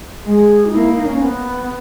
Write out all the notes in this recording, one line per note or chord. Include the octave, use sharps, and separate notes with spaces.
G#3 G#4
D#4
A#3 E4
D#4
C#4
B3